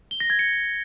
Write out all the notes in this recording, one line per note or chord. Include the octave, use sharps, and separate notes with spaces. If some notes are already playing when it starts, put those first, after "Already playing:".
G7
A#6
G#6
C#7